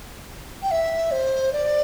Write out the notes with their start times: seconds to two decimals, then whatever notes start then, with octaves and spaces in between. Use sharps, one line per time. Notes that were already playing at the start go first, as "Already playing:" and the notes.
0.63 G5
0.71 E5
1.11 C5
1.53 D5